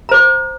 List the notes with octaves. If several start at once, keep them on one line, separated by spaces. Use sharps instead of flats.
C5 A#5 D6